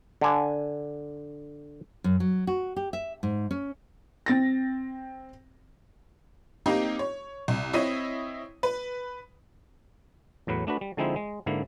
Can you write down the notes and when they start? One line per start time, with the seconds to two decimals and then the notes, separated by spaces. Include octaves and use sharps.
0.21 D3 G#5
2.04 F#2
2.20 F#3
2.47 F#4
2.76 G4
2.93 E5
3.23 G#2
3.51 C#4
4.26 C4 A6 A#6
6.66 A#3 C4 D#4 G4
6.99 C#5
7.48 C2
7.73 C4 E4 C#5 D#5 D#7
8.63 B4
10.47 E2 A2 F#3 B4
10.67 A3 D4 F#4 B4
10.81 G3
10.97 D3 F3 G#3 C4 D#4 E4
11.16 G#3
11.46 G#2 D3 A#3 E4